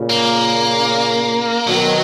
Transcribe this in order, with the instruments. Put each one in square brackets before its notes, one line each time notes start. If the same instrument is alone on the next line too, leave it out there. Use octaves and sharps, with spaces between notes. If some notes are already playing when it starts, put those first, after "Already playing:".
Already playing: [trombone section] A#2 C#3
[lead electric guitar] A#3
[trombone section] B2 D#3 [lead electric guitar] F#3